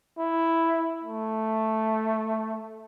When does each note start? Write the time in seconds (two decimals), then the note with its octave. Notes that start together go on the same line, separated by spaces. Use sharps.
0.18 E4
1.05 A3